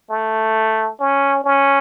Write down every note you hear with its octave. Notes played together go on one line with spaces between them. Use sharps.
A3
C#4
C#4